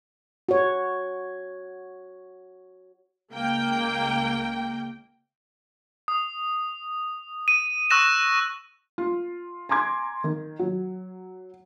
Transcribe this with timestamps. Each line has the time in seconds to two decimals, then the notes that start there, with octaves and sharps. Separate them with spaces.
0.49 F#4 C#5
3.32 C#2 A#3 G5
6.08 D#6
7.48 D#7
7.90 C#6 E6 F#6 A#6 E7
8.98 F4
9.69 G#5 A#5 C6 D6 G#6
10.24 D#3
10.59 F#3